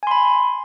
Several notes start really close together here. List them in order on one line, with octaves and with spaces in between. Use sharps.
G#5 C6 B5